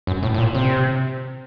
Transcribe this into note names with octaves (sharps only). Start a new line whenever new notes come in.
F#2
A2
A2
A#2
C3